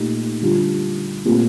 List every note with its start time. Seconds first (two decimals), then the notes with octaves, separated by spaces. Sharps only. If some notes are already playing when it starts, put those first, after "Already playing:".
Already playing: A#2 A3 D#4 G4
0.41 D3 G3 D4 F4
1.25 A#2 A3 C4 G4